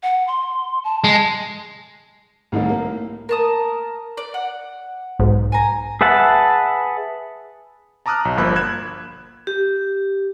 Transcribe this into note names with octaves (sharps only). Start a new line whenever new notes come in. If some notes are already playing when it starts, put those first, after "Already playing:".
F#5
C6
A5
G#3
C2 A2 D#3 G3
A2 A#3
A#4 A5 D#6
D5
F#5
B1 G#2
G#5 A#5
G#4 B4 E5 F#5 A5
A5 A#5 D6 D#6 F6 F#6
B1
G1 F3 A#3 B5 E6 F#6
F#6 G#6 E7
G4